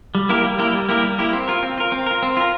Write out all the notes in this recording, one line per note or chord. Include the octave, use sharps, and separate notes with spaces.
G3
A#3 E4 G4 A#4
G3
A#3 E4 G4 A#4
G3
A#3 E4 G4 A#4
G3
A#3 E4 G4 A#4
C4
F4 A#4
C4
F4 A#4
C4
F4 A#4
C4
F4 A#4